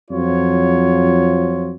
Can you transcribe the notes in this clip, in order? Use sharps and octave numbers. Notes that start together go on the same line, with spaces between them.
F2 F3 F#3 F4 C#5